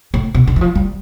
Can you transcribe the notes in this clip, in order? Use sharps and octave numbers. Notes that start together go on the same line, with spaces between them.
A2
B2
D3
E3
F3
G3